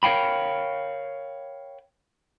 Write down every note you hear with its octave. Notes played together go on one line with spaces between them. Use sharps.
A#4 C#5 F5 G5 B5